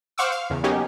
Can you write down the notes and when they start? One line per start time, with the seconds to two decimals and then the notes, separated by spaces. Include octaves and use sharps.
0.18 C5 F5 F#5 C#6 D6 E6
0.32 F5
0.50 E2 C#3
0.63 F#3 A#3 B3 C#4 D#4 G4